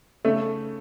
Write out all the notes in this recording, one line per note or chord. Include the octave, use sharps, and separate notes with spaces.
C#3 A3 A4